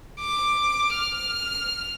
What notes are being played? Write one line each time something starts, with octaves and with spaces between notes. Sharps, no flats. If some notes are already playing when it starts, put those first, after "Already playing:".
D6
F6